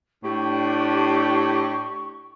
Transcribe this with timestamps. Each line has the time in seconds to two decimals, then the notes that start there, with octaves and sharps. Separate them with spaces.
0.24 A2 D4 G4 C#6